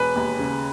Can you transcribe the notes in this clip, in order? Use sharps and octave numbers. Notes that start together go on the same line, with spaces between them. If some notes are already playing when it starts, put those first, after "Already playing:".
Already playing: E1 B4
D#2
C#3